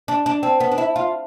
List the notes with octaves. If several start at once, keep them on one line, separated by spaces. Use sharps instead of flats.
D4
D4
C4
B3
D4
E4
F4